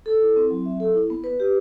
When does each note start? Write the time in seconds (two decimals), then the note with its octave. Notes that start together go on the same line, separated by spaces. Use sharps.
0.06 A4
0.21 E4
0.36 C4
0.51 F#3
0.66 E5
0.80 A4
0.95 E4
1.10 B3
1.24 B4
1.40 G4